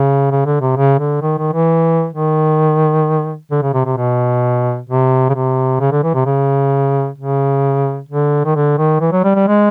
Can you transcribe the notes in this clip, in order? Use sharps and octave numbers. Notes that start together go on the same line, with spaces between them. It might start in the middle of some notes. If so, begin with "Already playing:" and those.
Already playing: C#3
C#3
D3
C3
C#3
D3
D#3
D#3
E3
D#3
D3
C#3
C3
C3
B2
C3
C#3
C3
C#3
D3
E3
C3
C#3
C#3
D3
D#3
D3
D#3
E3
F#3
G3
G3
G#3